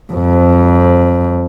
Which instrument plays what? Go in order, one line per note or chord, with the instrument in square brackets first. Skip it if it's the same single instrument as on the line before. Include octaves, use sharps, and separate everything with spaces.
[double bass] F2